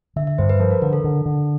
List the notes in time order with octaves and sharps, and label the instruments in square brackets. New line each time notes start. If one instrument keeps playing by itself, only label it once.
[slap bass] D3 [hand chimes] E5
[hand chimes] E5
[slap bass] G2 [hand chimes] C5
[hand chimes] B4
[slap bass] F3 [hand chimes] A#4
[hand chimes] A#4
[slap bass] D3 [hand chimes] A#4
[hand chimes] A4
[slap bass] D3
D3